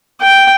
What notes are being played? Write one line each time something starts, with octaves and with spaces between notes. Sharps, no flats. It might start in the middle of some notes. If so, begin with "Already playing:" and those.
G5